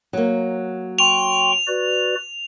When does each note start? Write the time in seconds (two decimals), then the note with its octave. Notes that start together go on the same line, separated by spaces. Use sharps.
0.13 F#3 A#3
0.99 G5 C6 C#6 F7
1.67 F#4 B4 D5